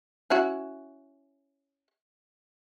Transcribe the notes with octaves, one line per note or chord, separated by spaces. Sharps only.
C#4 E4 F#4